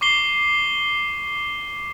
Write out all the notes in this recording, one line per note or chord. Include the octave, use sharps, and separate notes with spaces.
C#6 D6 C7 G7